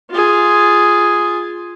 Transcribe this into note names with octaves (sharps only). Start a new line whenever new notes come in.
F4 G#4